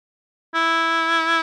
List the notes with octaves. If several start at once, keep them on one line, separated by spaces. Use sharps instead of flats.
E4